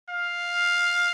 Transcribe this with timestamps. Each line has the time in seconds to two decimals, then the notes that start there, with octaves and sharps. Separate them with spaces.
0.09 F5